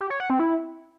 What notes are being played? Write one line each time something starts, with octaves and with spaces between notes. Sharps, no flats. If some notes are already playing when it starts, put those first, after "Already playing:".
G4
C#5
F#5
C4
E4